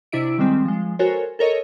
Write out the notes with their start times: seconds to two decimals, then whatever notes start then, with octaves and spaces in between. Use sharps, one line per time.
0.12 C3 D4 E4 D#5 E5 D7
0.38 D#3 G3 G#3 C4
0.65 F3 G#3
0.99 F#4 A4 A#4 C5 C#5 G#5
1.39 A4 A#4 C#5 D#5